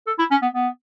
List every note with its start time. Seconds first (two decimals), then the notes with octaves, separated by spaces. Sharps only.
0.07 A4
0.19 E4
0.31 C#4
0.42 B3
0.54 B3